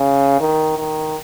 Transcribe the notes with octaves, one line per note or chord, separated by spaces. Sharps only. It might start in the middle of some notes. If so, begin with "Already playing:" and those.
Already playing: C#3
D#3
D#3